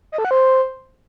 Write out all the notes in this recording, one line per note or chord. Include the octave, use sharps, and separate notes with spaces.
D#5
A4
F#5
C5